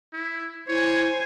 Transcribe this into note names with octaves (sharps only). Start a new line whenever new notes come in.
E4
E4 C5 C#5 G#5